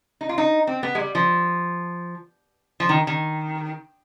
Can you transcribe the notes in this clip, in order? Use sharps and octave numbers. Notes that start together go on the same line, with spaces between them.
D#4
F4
D#4
C4
B3
G#3
G3
F3
F3
D#3
D#3